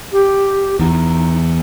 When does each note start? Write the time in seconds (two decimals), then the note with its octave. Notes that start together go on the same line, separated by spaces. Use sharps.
0.12 G4
0.80 E2 D#4